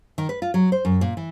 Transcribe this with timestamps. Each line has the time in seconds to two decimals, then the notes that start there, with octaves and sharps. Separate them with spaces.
0.18 D#3
0.29 B4
0.42 F4
0.54 F#3
0.72 C5
0.85 F#2
1.01 A#2
1.17 E3